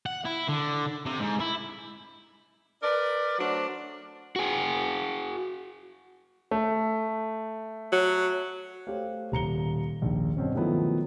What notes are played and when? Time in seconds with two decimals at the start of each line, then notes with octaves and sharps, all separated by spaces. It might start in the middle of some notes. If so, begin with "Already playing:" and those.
0.06 F#5
0.25 E4
0.49 D3
1.06 C3
1.20 G#2
1.41 E4
2.83 A#4 B4 D5
3.39 F#3 A3 D4 F#4 C5
4.36 F#4 G#4
6.51 A3
7.92 F#3
8.87 A3 G4 C5 C#5 F5
9.32 D#1 A#5 C#7 G7
10.02 A#1 D#2
10.37 G2 B2 C4 C#4
10.55 D#3 F3 F#3 A3 B3 E4